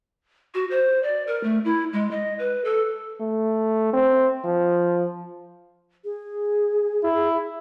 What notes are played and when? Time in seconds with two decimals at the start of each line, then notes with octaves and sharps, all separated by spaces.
0.54 F#4
0.71 C5
1.03 D5
1.27 A#4
1.43 A3
1.65 E4
1.93 G#3
2.11 D#5
2.39 B4
2.64 A4
3.20 A3
3.93 C4
4.44 F3
6.04 G#4
7.04 E4